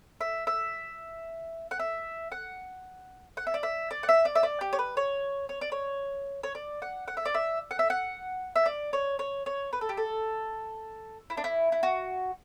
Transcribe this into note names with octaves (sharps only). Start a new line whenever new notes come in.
E5
E5
F#5
E5
F#5
F#5
E5
D5
E5
D5
F#5
E5
D5
E5
D5
G4
C#5
B4
C#5
C#5
D5
C#5
C#5
D5
F#5
F#5
E5
D5
E5
F#5
E5
F#5
E5
D5
C#5
C#5
C#5
B4
A4
G4
A4
E4
D4
E4
E4
F#4